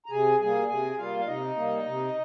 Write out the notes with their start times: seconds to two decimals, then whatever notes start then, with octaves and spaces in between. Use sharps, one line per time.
0.06 A#5
0.10 C3 G#4 G#5
0.40 G3 A#3 G#4 G#5
0.69 C3 G#4 G#5
0.98 G3 A#3 F4 F5
1.18 F5
1.27 C3 D#4 D#5
1.56 G3 A#3
1.86 C3